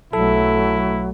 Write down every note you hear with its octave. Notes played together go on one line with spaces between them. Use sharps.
B1 F#3 A3 E4 A4